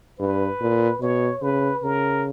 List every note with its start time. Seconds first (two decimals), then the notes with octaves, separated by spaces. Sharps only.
0.19 G2 B4
0.61 A#2
1.01 B2 C#5
1.42 C#3 B4
1.83 C#3 A#4